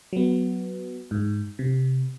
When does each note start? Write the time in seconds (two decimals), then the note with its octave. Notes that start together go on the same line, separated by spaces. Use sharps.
0.13 F#3 B3
1.11 G#2
1.59 C3